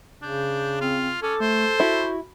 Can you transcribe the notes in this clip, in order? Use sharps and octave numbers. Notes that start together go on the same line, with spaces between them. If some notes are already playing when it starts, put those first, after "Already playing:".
C#3 D4 G6
C4 F4
C#4 A4 D6
A3 C5
E4 F#4